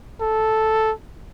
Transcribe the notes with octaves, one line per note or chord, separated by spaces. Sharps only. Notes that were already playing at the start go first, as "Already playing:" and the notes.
A4